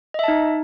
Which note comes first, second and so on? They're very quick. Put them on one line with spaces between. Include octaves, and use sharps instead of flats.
D#5 E5 A5 D#4